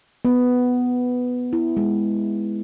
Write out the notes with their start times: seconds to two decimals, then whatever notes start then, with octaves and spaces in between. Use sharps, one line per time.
0.25 B3
1.53 E4
1.77 G#3